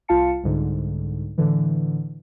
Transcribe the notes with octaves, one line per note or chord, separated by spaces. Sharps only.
C2 F4 F5 A5 C#7
C2 G#2 D3
A2 D3 E3